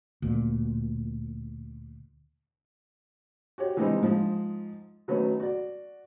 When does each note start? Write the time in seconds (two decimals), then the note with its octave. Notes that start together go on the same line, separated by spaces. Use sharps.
0.22 D2 A#2
3.58 F#4 G4 C#5
3.77 E3 G3 G#3 C4 D4 D#4
4.01 G#2 F3 G#3
5.08 B2 D#3 F#3 A3 B3 C#4
5.40 F#4 D5